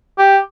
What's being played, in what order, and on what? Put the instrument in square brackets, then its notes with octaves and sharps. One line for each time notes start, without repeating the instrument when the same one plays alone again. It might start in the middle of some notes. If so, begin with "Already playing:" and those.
[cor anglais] G4